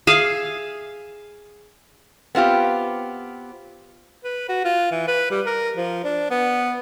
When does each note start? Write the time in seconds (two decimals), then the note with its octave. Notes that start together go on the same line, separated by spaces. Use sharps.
0.07 G#4 E5 F5
2.35 B3 C4 F4 G4
4.24 B4
4.49 F#4
4.64 F4
4.91 E3
5.08 B4
5.31 G3
5.46 A#4
5.77 F3
6.04 D4
6.30 B3